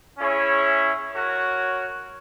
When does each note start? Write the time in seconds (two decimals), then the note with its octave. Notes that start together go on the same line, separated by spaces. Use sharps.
0.18 C#4 E4 G#4 C#5 E5
1.12 F#4 A#4 C#5